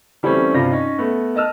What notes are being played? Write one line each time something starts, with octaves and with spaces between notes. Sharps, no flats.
E3 G3 A3 C4 C#4
G2 C3 F4 A#6
C#4 D#4
A3 B3
A#4 D#5 A5 E6 F6